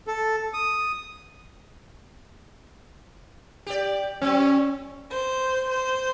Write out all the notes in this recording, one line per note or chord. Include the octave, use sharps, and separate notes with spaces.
A4
D#6
G4 D5
F#3 C4 C#4
C5
C5